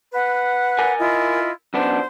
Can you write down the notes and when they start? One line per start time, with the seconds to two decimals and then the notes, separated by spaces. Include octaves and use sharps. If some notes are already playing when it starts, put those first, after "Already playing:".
0.13 B4 F#5
0.79 A#4 G#5
0.99 E4 F4 D#5
1.74 F#2 B3 D4 C5